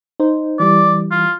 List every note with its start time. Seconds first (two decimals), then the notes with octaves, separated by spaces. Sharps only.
0.20 D#4 C5
0.60 E3 G3 D5
1.11 F4